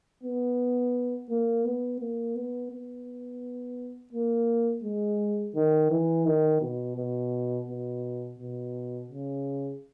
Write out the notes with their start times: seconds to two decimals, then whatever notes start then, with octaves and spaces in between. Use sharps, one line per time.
0.23 B3
1.30 A#3
1.65 B3
2.00 A#3
2.35 B3
2.71 B3
4.13 A#3
4.84 G#3
5.55 D#3
5.91 E3
6.26 D#3
6.61 B2
6.97 B2
7.68 B2
8.39 B2
9.09 C#3